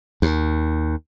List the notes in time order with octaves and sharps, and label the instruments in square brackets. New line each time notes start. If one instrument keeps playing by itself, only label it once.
[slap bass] D#2